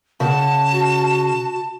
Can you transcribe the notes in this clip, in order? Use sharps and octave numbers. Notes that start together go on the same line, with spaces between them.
C#3 F#5 A5
F#4